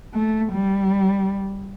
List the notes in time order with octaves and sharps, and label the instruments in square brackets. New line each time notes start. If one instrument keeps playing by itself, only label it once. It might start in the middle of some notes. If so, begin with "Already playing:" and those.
[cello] A3
G3